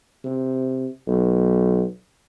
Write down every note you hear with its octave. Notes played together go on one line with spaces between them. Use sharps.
C3
B1